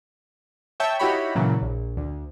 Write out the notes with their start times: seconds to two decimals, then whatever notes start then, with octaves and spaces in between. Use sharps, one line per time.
0.80 C#5 E5 G5 A5
0.99 D#4 E4 F#4 G4 C#5 B5
1.35 A#2 C#3 E3 F#3
1.62 A#1
1.97 D2